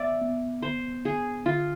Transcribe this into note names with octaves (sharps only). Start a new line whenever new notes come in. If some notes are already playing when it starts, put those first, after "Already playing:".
Already playing: B3 D5 E5
B3
B3 C5
D4 G#4
D3 F4